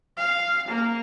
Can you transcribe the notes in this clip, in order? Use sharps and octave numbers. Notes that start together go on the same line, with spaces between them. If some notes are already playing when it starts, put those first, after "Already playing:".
F5
A#3